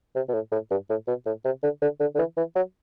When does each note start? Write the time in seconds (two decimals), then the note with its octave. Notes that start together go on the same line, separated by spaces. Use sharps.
0.16 C3
0.29 B2
0.34 A2
0.52 A2
0.71 G2
0.90 A2
1.08 B2
1.26 A2
1.45 C3
1.63 D3
1.82 D3
2.00 D3
2.15 D3
2.18 E3
2.37 E3
2.56 F#3